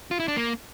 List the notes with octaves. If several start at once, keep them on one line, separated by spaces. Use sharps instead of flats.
F4
E4
D4
A#3